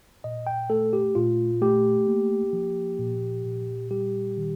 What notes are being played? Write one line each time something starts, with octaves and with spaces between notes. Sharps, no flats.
A#2 D#5
G5
A3 A4
G4
A#2 F4
A3 G4
A#3
F3
A#2
A#2
G3 G4
D#3